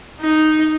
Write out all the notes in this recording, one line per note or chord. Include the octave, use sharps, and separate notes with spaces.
D#4